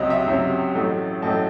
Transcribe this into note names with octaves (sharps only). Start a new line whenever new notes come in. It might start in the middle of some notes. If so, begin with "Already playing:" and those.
Already playing: C#2 C3 F#3 C#4 D#5
E5
C#2 C3 F#3 C#4
A1 A2 F#3 A3
A1 A2 F#3 A3 A5